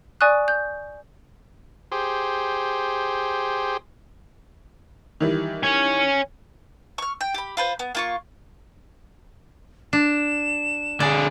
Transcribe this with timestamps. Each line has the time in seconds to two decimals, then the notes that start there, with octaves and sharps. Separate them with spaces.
0.21 D5 G#5 C#6 D#6 F#6
0.48 G6
1.92 G4 G#4 C5
5.20 D#3 E3 G3
5.63 C#5 G#5
6.98 C#6 F6
7.21 G5
7.34 G4 B5
7.57 F4 B4 C5
7.79 B3
7.95 A#3 F4 C#6
9.93 D4 E7
11.00 D3 G#4 D5